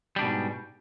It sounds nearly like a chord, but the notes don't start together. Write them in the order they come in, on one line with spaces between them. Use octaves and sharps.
G3 D4 B2 G#2